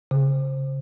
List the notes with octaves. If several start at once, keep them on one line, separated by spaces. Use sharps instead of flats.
C#3